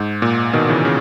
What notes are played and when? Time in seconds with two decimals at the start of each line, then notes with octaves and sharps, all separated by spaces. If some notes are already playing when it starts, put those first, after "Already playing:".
Already playing: G#2
0.22 A#2
0.53 B2 D#3
0.69 C#3 E3
0.85 C#3